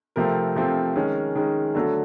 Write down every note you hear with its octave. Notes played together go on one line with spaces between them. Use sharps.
C3 F3 A3 C4 A#4
C3 F3 A3 C4
D#3 G#3 C#4
D#3 G#3 C#4
D3 F#3 A3 A4